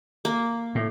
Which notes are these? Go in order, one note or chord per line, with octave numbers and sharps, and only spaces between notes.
A#3
A2